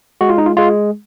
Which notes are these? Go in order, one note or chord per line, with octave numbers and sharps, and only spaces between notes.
G#3 F#4
F4
D#4
F4
G#3 F4